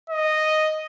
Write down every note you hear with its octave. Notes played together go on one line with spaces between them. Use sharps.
D#5